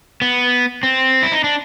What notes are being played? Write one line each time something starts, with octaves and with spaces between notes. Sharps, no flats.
B3
C4
E4
D#4
D4